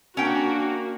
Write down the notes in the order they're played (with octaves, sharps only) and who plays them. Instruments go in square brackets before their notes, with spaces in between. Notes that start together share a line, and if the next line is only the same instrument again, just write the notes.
[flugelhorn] A#3 [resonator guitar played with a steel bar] C#4 G5 [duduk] D4 [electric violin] F#4